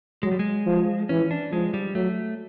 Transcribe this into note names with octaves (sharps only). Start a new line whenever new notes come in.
F#3 G#3
G3
G#3
F3
E3 C#4
D4
F3 G#3
G3
F#3 A3